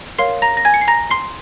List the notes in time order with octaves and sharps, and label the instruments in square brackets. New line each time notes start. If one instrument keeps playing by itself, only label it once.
[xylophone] A#4 C#5 F5 C6 C7
A#5 A#6
A#6
G#5 G#6
C#7
C7
A#5 A#6
C6 C7